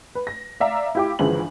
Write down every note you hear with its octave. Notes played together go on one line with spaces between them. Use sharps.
B4
A#6
D5 E5 F5 A#5
E4 F4 G4 G5 D6
G1 C#3 E3 F3 G#3 F#7